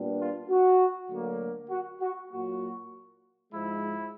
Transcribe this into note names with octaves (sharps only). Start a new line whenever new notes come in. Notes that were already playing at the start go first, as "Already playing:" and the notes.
Already playing: A#2 G3 B3 D4
F4
F#4
D2 D3 F#3 A#3
F#4
F#4
A#2 F#3 A#3 F#4
G#2 F3 G#3 E4